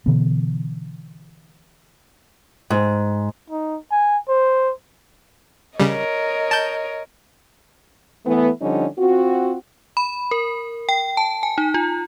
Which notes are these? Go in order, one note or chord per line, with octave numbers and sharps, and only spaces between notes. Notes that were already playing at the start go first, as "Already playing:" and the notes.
B2 D3 E3 B3
G#2
D#4
G#5
C5
C#3 G3 A#4 C#5 D#5
A5 G6
E3 A3 B3
D3 F3 G3 C#4 D#4
C4 F4 F#4
B5
A#4
G5
A5
G#5
D#4
F4